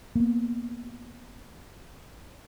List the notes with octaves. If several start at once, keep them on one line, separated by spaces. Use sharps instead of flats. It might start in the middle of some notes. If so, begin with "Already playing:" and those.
A#3 B3